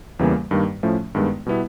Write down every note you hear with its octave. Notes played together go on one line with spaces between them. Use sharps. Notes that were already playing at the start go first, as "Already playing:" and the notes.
E2 C#3 E3 G3 A#3
G2 D#3 G3 A#3
A2 F3 A3 C#4
G2 D#3 G#3 B3
B2 G3 B3 E4